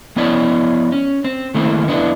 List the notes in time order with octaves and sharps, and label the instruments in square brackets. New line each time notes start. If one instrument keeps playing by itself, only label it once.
[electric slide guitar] F3 B3 E4 C#5 D5
C#4
C4
D#3 A3 A#3 C4 E4
F2 B3 D4 E4